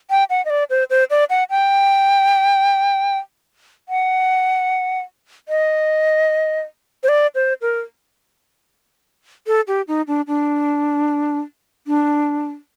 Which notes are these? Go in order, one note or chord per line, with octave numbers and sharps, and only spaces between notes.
G5
F#5
D#5
D5
C5
C5
D5
F#5
G5
F#5
D#5
C5
D5
C5
A#4
A4
G4
D#4
D4
D4
D4